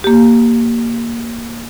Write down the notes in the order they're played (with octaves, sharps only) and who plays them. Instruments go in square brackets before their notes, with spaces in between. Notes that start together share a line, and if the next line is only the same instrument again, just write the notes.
[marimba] A#3 G4